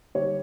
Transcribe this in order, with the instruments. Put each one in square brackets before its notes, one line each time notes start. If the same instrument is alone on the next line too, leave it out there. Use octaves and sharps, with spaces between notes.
[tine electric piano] D3 G3 A#3 D#4 G4 [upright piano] C#5